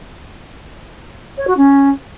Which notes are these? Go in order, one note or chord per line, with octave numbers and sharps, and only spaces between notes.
C#5
F#4
C#4